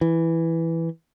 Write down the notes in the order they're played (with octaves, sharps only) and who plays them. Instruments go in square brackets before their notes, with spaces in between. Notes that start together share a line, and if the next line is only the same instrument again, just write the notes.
[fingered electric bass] E3